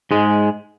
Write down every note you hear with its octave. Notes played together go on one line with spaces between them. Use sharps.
G#2 G#3